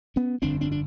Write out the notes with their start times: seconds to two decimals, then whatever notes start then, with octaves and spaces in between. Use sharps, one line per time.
0.16 B3 C#4
0.42 G1 F2 D3 C4 D4
0.61 C4 D4
0.72 D4